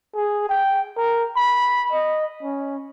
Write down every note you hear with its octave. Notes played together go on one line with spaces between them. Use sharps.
G#4
G5
A#4
B5
D#5
C#4